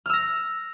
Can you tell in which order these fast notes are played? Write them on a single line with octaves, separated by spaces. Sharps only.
F6 E6 A#6